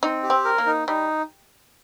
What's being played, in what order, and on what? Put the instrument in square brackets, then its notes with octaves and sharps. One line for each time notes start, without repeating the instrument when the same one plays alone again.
[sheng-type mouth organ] C4 [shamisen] D#4
[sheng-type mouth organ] G4
[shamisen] C4
[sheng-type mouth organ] A#4
[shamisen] A#3
[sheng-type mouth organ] D#4
[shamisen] G3 [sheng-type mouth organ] D#4